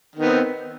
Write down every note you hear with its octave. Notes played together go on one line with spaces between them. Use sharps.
D#3 B3 C4